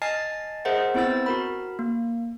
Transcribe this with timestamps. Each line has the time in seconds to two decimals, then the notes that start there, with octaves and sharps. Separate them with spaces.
0.02 D#5 G#5 A5 F6 A6 C7
0.65 G#4 A#4 C5 D#5 E5 F#5
0.95 B3 C4 E4 C5 E6 A6
1.26 F#4 A#4 B5
1.79 A#3